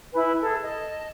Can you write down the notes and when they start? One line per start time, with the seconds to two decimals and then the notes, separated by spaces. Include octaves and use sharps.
0.14 E4 B4 G#5
0.41 G#4 A4
0.61 D#5 A5